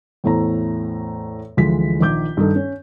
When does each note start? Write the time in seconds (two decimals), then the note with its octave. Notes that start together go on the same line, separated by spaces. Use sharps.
0.24 E2 A2 A3 C5 A#5
1.57 D2 E3 F3 G#3 B6
2.00 A#1 D#3 D6 G6
2.37 G2 D#3 D#4 A4
2.56 C#4